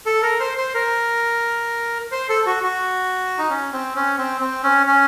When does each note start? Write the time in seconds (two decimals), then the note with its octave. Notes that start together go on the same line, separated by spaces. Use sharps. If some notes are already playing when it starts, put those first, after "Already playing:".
0.06 A4
0.23 A#4
0.40 C5
0.58 C5
0.74 A#4
2.11 C5
2.29 A4
2.46 F#4
2.63 F#4
3.38 D#4
3.50 C#4
3.73 C4
3.95 C#4
4.18 C4
4.41 C4
4.63 C#4
4.86 C#4